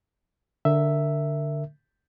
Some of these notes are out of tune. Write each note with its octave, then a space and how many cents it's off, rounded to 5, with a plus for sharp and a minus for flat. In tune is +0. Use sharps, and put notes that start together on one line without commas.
D3 +0 A#4 -20 E5 +0